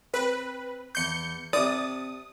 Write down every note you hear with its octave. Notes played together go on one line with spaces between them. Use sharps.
C4 B4
E2 C6 G6 C#7
C3 D5 A5 D#6